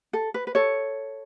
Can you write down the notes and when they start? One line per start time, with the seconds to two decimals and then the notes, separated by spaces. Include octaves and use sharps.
0.13 A4
0.34 B4
0.47 B4
0.55 A4 C#5